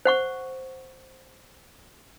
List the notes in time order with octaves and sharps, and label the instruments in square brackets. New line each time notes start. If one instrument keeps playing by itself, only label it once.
[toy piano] C5 F#5 C#6